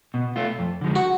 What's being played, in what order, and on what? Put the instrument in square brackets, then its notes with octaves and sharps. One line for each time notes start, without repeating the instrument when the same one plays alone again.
[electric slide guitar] B2
A3 F4
F2
D3 F3 G#3
[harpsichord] F#4